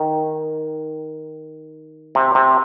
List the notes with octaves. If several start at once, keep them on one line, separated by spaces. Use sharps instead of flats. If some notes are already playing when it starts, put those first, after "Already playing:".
Already playing: D#3
C3
C3